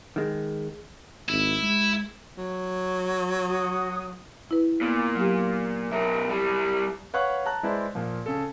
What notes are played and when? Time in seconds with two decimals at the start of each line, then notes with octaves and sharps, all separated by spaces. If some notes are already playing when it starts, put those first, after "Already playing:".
0.16 D#3 G#3
1.29 G#1 E4
1.63 G#3
2.38 F#3
3.46 F#4 D#6
4.51 E4 B4
4.81 A#2 B3
5.16 F#3 G4
5.92 B1 A#4 E5
6.29 G3 E4
7.14 B4 C#5 F5 F#5 C#6 F#6
7.45 A5 A#5 F#6
7.63 G#3 E4 B4 C5 D5
7.95 A#2 F3
8.26 C#3 A4